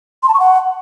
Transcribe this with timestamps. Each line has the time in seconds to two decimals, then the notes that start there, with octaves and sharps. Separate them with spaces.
0.23 C6
0.29 A5
0.34 C#6
0.40 F#5